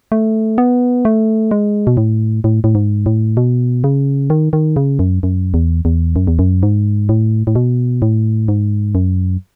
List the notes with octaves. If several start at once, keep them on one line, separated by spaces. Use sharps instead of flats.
A3
B3
A3
G#3
B2
A2
A2
A2
G#2
A2
B2
C#3
D#3
D#3
C#3
F#2
F#2
E2
E2
F#2
E2
F#2
G#2
A2
A2
B2
A2
G#2
F#2